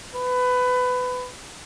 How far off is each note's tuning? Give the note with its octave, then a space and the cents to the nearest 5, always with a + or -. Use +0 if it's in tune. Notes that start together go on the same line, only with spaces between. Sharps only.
B4 +20